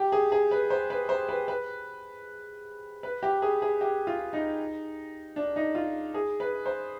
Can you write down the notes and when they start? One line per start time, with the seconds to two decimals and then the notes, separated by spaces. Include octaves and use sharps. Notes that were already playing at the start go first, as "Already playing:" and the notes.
Already playing: G4
0.12 G#4
0.32 G#4
0.51 B4
0.70 C5
0.90 B4
1.09 C5
1.29 B4
1.48 B4
3.03 B4
3.23 G4
3.42 G#4
3.62 G#4
3.81 G4
4.07 F4
4.33 D#4
5.36 D4
5.56 D#4
5.75 F4
6.14 G#4
6.40 B4
6.66 C5